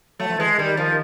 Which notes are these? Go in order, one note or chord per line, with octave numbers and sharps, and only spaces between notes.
F#3 A3
F3
E3 G#3
D#3 G3
F3